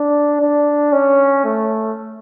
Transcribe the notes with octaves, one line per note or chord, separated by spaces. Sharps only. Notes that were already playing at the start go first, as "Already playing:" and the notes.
Already playing: D4
D4
C#4
A3